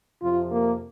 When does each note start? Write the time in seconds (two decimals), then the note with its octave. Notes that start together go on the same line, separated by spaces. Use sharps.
0.21 F2 C3 F3 F4
0.50 A#3